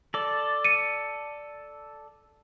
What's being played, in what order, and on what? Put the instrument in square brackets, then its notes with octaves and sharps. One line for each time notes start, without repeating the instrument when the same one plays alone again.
[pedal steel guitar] A4 D5
[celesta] C#7 D#7